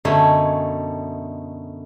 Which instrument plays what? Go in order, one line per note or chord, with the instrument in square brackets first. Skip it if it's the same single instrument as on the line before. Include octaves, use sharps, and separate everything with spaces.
[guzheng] F#2 B2 D3 A3 D#4 G#5